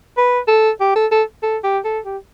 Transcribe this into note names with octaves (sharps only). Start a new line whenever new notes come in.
B4
A4
G4
A4
A4
A4
G4
A4
G4